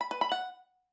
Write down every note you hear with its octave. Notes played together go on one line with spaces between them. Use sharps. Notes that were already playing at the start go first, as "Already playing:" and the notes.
B5
B4
B5
F#5